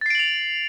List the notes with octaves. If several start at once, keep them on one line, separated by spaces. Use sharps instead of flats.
A6 C7 D7 F7 F#7